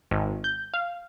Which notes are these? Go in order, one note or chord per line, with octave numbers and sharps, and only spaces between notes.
G#1
G6
F5